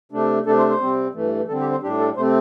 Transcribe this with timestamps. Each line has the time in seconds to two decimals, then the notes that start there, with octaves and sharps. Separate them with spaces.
0.12 C3 A3 D4
0.46 C3 A3 D4 A4
0.58 C5
0.70 C5
0.81 C3 G3 C4
1.14 G2 E3 A3
1.48 D3 G3 C4 A4
1.60 G4
1.71 C5
1.82 A2 G3 D4 G4
1.99 A4
2.16 C3 A3 C4 C5